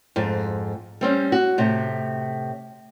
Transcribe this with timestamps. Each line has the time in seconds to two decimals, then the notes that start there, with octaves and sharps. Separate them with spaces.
0.16 F2 G#2
1.01 G3 C4 C#4
1.32 F#4
1.58 A2 C3